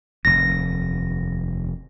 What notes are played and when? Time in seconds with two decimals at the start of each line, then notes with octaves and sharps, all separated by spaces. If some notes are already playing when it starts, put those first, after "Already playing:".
0.25 F1 D#2 A#6